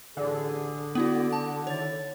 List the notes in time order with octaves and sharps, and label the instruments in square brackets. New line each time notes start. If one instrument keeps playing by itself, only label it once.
[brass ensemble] A1 G#4 [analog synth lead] D3
[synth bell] B3 E4 F#4 [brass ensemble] A4 D5
[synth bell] A5
[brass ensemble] D#3 E4 [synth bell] C#5 A6